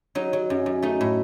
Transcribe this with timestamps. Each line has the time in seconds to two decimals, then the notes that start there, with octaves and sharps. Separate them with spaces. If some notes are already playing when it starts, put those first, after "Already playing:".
0.15 F#3 D#4
0.33 F#3
0.50 F#2
0.66 F#2
0.82 A3 D#4
1.01 A2